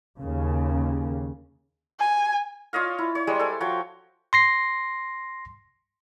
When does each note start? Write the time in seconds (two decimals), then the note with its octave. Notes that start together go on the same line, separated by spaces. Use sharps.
0.20 D#2 C#3
1.99 G#5
2.73 F4 C#5 D#5 F5
2.98 E4
3.15 C#5
3.27 G3 G#3 G#4 C5
3.39 A4 G#5
3.60 F3 F#4 C#5 G5
4.33 C6 A#6 C7